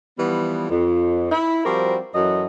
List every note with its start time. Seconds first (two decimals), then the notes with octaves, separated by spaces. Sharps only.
0.18 E3 F3 G3 B3
0.70 F2
1.32 E4
1.65 F3 G3 C4 F#4 A#4
2.14 F#2 E3 F#3 A4 D#5